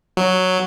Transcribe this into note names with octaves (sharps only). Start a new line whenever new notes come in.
F#3